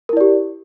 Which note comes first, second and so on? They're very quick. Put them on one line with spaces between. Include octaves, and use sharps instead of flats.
A#4 E4 D5 G4